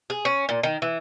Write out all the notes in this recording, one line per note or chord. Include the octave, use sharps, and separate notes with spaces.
G#4
C#4
A#2
D#3
E3